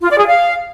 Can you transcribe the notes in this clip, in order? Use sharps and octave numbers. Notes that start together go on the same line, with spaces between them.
F4
D5
G#4
F5